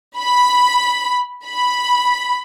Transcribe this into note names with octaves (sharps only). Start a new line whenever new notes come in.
B5
B5